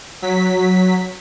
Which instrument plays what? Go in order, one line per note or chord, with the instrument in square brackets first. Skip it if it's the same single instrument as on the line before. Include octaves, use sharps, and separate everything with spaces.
[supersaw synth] F#3 B6